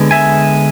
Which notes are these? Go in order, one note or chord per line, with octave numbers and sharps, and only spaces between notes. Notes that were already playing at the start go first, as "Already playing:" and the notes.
Already playing: D3 G#3 B3
E5 G#5